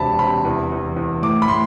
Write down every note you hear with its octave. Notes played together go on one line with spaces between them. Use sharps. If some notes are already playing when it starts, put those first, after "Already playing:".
Already playing: E1 C3 A5 B5
C3 B5
E2
E2
E2
A2 D6
B5
A2 C6